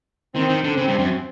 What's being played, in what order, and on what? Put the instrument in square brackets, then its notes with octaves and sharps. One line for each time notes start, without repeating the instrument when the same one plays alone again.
[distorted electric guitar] D#3 [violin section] C4
[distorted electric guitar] D#3
D3
[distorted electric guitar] C#3 [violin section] C4
[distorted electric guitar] G2
F#2